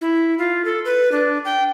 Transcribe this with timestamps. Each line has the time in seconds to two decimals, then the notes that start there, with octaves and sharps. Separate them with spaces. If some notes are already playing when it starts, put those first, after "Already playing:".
0.01 E4
0.38 F4
0.65 A4
0.85 B4
1.12 D4
1.45 G5